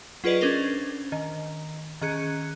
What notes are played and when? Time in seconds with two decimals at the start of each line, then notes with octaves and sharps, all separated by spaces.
0.24 F#3 F4 G#4 B4 D5 D#5
0.41 C#4 D4 A#4 C5
1.12 D#3
2.01 D#3 C#4 G#4 F#6 C#7